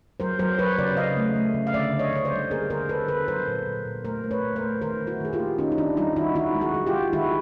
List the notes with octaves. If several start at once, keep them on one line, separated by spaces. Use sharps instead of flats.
F#3 A#4 C5
F#3 A#4 C5
F#3 B4 C#5
C#3 C5 D5
C#3 D#5 F5
A3
A3
C#3
F5
D3 D5 E5
D3
C#5 D#5
D3 C#5
C5 D5
G3
A#3 G#4 A#4
D3 A#4 C5
D3 A4 B4
D3 A4 B4
F#3 A#4 C5
A#2
A#2
A#2
A3 A#4 C5
A3
B4 C#5
A#2
A#4 C5
A3
D#3 A#4 C5
D#3
E4 F#4
D#3 G#4
F4 G4
A#3
D#3 C#4 D#4
D#4
D#3 D4 E4
G3 D#4 F4
D#3 E4 F#4
D#3 E4 F#4
G#3
F#4 G#4
G#3
F4 G4
G#3
D#3 E4 F#4